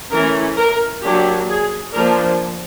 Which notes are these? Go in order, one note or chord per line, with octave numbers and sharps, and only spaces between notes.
E3 A3 C#4 A#4
A#4
F#3 A#3 D4 G4
G#4
F3 A#3 D4 A#4